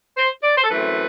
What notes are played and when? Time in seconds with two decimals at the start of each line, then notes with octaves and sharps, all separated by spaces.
0.17 C5
0.43 D5
0.57 C5
0.64 A4
0.71 F#2 E3 A3 C4 B4